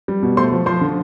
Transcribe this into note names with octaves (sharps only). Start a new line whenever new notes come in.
G3
B2
A3 C5 C6
F3
F3 C5 C6
D3